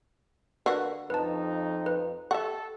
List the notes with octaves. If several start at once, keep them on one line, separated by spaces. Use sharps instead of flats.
D3 F#4 A#4 B4 F5 C#6
F2 D#4 B4 A5
B4
G4 A4 E5 F#5 C#6